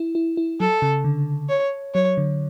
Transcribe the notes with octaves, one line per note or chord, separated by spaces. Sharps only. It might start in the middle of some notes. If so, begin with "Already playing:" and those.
Already playing: E4
E4
E4
F#3 A4
C#3
D3
C#5
F#3 C#5
D3